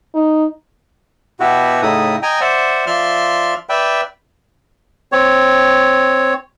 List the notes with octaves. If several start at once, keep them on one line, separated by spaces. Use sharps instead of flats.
D#4
B2 B3 E4 F#4 G4
A2 C#3 A3 D#4 E4 D#6
D#5 G5 G#5 A#5
C5 D5 E5 F#5
F3 D5 E5 C6 F6
B4 D5 E5 G5
C4 C#5